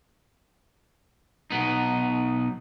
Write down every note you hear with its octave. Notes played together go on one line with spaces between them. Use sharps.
B1 B3 D#4